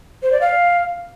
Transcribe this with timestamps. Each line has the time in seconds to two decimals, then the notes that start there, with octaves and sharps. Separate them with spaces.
0.23 C5
0.32 D5
0.41 F5